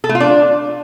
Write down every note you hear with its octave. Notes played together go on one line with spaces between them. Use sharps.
A4
A3
F4
D4